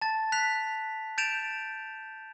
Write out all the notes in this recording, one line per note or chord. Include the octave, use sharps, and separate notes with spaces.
A5 A6
F#6 B6 F7
G6 A6 D7 E7 F7